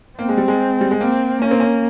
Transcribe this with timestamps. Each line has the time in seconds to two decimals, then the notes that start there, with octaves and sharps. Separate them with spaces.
0.19 A#3 C4
0.29 G#3
0.37 G3
0.48 G#3
0.81 G3
0.91 G#3
1.01 A#3 C4
1.42 A#3 C#4
1.51 C4
1.60 C#4